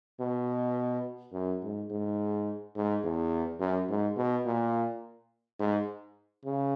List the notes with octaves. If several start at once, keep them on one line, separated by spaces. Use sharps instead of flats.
B2
F#2
G#2
G#2
G#2
E2
F#2
G#2
B2
A#2
G#2
C#3